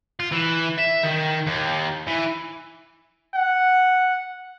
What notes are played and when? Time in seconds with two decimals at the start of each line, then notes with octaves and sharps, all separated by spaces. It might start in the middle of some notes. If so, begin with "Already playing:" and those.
0.20 F4
0.32 E3
0.79 E5
1.05 D#3
1.47 D#2
2.07 E3
3.34 F#5